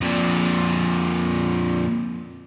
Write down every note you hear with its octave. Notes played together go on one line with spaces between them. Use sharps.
F2 A#2